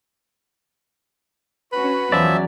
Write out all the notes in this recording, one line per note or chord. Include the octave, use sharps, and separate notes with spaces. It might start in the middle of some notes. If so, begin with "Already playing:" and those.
C#4 F#4 B4
E2 F3 F#3 C#4 D5 E5